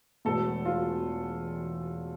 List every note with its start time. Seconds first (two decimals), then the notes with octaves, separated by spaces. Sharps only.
0.25 E1 E2 B2 A3 A4
0.65 F4